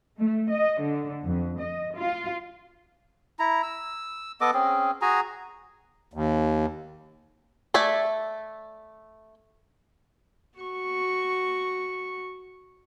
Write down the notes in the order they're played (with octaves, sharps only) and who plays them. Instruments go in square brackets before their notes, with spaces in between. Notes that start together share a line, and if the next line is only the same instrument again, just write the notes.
[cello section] A3
D#5
D3
F2
D#5
F4
[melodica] E4 A#5
E6
B3 A4 D#5 D6
C4 C#4 G#4
F#4 G#4 G#5 A#5
[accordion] D#2
[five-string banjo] A3 D5 E5 G#5
[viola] F#4 C#6